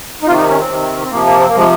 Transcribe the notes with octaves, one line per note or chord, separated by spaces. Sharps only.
D#4
C3 D#3 F4
D#4
C#4
C4
C3 D#3
C4
C3 F3 A#3
A#3
C4
A#3
C3 F3 G#3